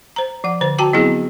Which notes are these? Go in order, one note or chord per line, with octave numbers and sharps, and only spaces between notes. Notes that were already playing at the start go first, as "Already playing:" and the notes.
C5 A#5
F3 F#5
D3 C5
F#4 G5 A5 A#5 D6
F#3 B3 C4 E4 G#4